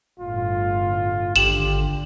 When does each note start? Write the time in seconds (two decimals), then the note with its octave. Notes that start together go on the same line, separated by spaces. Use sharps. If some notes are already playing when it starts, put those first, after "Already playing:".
0.20 G1 A2 F4
1.36 G#1 D3 G4 E7 F#7